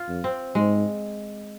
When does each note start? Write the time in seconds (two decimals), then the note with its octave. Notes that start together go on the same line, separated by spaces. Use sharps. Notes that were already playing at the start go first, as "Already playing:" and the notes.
Already playing: F4
0.08 F2
0.24 C4
0.55 G#2 G#3